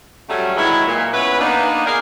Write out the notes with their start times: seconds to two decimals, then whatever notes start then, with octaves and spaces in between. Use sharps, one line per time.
0.30 F#3 G3 A3 C#4
0.56 D#3 E3 F#3 G#3 E4 C#5
0.87 A#2
1.14 B3 C#4 E4 B4
1.40 A#3 B3 D4 D#4
1.86 G#4 A#4 F5